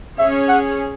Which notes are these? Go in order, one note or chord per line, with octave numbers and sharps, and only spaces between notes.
C#4 G#4 C#5 E5
F#5